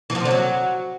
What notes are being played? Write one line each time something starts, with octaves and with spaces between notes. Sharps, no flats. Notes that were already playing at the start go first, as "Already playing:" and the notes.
E3
F3
C3
D3
F#3